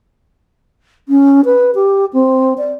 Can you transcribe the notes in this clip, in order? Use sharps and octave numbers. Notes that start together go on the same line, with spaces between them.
C#4
B4
G4
C4
D5